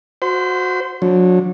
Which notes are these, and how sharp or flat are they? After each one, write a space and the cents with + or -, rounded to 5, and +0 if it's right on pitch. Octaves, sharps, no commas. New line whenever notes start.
F#4 -15 C5 -10 C6 -45
F#3 -30 D4 -15